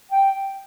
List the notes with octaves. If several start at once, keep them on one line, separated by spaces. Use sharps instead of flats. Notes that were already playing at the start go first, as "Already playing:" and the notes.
G5